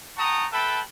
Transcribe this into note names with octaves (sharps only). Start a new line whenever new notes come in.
F#5 G5 A5 A#5 C#6 D#6
A4 B4 E5 G5 A5 B5